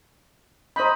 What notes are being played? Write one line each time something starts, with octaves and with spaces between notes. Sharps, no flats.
D#4 C5 D#5 B5